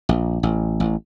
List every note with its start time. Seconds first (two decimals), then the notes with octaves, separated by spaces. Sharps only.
0.09 A#1
0.43 A1
0.80 A1